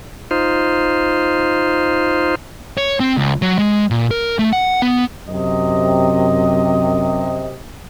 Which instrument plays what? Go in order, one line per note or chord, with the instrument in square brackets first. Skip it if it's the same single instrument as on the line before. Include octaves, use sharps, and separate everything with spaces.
[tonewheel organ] D#4 F4 C5
[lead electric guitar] C#5
C4
C#2
F#3
G#3
A#2
A#4
A3
F#5
B3
[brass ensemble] F#2 C3 D#5